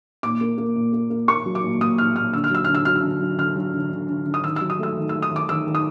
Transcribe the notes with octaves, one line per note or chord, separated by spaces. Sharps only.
A#2 D6
A#3
A#3
A#2
A#3
A#3
A#3 C#6
F#3
D6
A#2
A#2 D#6
A#2 F6
A#2 F6
D3 E6
F6
F#3 E6
D3 F6
E6
F#3 F6
E6
D3
F#3
D3 F6
F#3
D3
D3
D3
D3
D#6
D#3 E6
F#3 E6
D#6
A3 E6
D#3
A3 E6
D#6
D#3
D6
D#3 E6
D#3
D#6